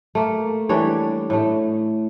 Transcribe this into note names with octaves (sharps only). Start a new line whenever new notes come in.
A3 A#3
E3 G3 D4 C#5
A2 A3